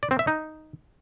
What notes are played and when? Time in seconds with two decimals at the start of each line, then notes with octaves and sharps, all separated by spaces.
0.03 D5
0.11 C4
0.19 E5
0.27 D#4